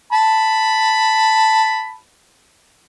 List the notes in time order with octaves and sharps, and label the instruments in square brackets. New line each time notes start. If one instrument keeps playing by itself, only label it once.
[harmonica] A5 B5